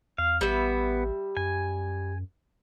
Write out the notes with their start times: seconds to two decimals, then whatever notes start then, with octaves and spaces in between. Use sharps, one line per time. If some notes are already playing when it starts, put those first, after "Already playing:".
0.18 E2 F5
0.41 A1 G3 B3 E5
1.37 F#2 G#5